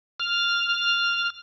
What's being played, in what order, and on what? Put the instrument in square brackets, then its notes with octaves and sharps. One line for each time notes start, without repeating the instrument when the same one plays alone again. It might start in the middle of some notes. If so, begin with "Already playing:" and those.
[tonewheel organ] F6